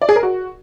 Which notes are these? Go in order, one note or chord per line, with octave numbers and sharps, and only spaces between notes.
D5
G#4
A#4
F#4